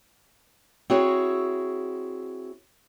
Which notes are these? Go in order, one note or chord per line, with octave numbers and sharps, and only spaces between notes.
C4 E4 F#4 G#4 C#5